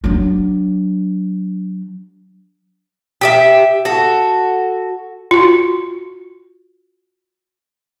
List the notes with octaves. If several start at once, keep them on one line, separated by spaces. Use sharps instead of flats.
F#3 D4
G4 G#4 E5
F#4 A4
F4 F#4